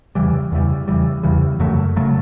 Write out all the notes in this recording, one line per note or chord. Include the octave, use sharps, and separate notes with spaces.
E2 C#3 E3 G3
E2 C#3 E3 G3
E2 C#3 E3 G3
E2 C#3 E3 G3
F#2 C#3 F#3 A3
F#2 C#3 F#3 A3